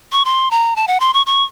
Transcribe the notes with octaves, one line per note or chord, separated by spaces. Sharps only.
C#6
C6
A#5
A5
F#5
C6
C#6
C#6